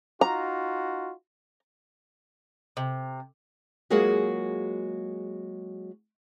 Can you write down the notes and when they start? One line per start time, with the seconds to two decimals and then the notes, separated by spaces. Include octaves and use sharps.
0.21 D#4 F4 F#4 A#5
2.77 C3
3.90 F#3 G#3 A#3 F4 F#4 G#4